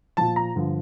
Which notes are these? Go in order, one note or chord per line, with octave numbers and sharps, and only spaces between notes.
A#2 F3 A5
A#5
G2 D3 F3